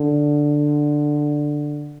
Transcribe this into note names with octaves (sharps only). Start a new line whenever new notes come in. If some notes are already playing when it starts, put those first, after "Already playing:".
Already playing: D3